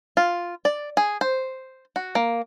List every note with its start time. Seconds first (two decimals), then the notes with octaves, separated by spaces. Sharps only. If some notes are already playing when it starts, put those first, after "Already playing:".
0.17 F4
0.65 D5
0.97 G#4
1.21 C5
1.96 F#4
2.15 A#3